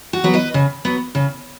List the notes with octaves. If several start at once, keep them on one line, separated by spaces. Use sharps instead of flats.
F#4
F#3 B3
B4 D#5
C#3
F#3 B3
C#3